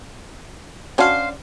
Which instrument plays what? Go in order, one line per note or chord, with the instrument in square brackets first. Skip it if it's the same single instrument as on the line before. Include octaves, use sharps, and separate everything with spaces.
[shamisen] C#4 D4 F#4 [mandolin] C5 F5